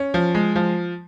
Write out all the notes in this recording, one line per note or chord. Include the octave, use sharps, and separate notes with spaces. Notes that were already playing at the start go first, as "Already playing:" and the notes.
Already playing: C#4
F3
G#3
F3